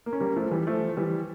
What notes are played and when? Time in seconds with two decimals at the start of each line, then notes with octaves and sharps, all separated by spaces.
0.06 A#3
0.13 C#4
0.20 G3 A#3
0.36 F3 A3
0.51 E3 G3
0.67 F3 A3
0.97 E3 G3